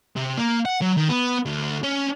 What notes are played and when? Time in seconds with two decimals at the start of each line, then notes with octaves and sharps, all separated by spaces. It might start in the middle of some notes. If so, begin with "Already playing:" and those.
0.16 C3
0.38 A#3
0.65 F#5
0.82 F#3
0.97 D#3
1.09 B3
1.46 D2
1.83 C#4